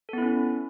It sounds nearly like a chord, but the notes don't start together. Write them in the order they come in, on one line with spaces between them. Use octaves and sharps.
A4 B3 E4 C#4